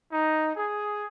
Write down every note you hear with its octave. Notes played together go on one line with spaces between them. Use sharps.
D#4
G#4